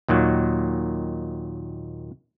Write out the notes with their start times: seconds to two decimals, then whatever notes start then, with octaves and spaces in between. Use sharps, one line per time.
0.08 D#2 A#2 D#3 F#3